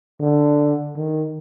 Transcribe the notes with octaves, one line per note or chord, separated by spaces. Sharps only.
D3
D#3